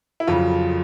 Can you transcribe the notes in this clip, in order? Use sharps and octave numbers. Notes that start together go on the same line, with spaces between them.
E4
F1 F2 C#3 F#3 F4